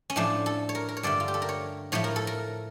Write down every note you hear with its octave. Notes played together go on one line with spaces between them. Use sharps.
C#4
A2 F3 A3 D4
A4
C#5
A#4
A#4
C#5
G2 D3 A3 D5
F4
G4
A4
A#4
C#5
A2 F3 A3 C#5
A#4
A4
A#4